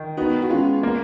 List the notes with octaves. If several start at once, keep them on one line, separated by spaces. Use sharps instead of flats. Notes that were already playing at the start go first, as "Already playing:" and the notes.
Already playing: D#3
B3 D#4 F#4
F#4
G#3 C#4 F4
A#3